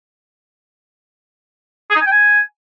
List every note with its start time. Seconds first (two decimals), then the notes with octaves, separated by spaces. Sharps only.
1.90 G#4
1.96 D#4
2.01 G#5
2.06 G5
2.12 G#5